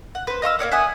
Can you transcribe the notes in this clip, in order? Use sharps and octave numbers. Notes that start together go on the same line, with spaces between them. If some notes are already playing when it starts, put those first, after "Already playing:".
F#5
B4 C5
D#5 F5 C#6 E6
A#3 E4 C#5 D5
E5 F#5 G#5 D#6